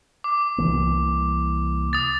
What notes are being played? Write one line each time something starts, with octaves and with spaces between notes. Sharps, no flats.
D6
C2 E3 A#3
D#6 A6